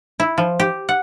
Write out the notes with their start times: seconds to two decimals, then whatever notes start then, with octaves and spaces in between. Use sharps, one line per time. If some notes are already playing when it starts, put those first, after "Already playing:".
0.20 E4
0.38 F3
0.60 G4
0.89 F#5